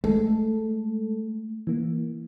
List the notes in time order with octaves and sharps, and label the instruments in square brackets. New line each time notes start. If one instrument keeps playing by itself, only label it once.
[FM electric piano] G#3 A4 [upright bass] A3
[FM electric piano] E3 A#3